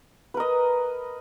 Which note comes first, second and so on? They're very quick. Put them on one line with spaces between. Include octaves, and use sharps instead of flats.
B4 A#4 D#5